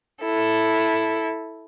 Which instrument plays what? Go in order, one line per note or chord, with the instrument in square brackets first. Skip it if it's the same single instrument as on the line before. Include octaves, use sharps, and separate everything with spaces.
[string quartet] E4 A4